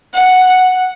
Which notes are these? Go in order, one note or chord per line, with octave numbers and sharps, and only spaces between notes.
F#5